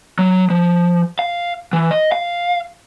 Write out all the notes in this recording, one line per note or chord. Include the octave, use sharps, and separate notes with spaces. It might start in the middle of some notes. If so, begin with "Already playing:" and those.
F#3
F3
F5
E3
D#5
F5